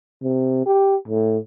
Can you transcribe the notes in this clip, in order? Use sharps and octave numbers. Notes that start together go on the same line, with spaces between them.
C3
G4
A2